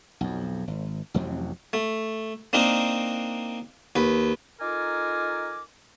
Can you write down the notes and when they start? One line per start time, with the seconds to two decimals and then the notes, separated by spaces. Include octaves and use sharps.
0.21 B1 F2
0.67 G#1
1.14 A1 F2 C3 F#3
1.73 A3
2.53 A#3 C4 D4 D#4 A#4
3.96 D#2 B4
4.60 D#4 F4 A4 A#4 G#5 D6